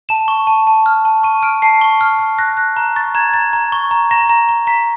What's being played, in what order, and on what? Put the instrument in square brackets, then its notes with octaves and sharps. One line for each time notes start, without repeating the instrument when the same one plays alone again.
[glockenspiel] A5 E7
C#6
A5
A5
F6
A5
C#6 D#7
F6 D7
A5 C7
C#6
F6
F6
F#6 A#6
F#6
A#5
C#6 A6
A#5 G#6
A#5 A6
A#5
C#6
A#5
A#5 A#6
A#5
A#5
A#5 B6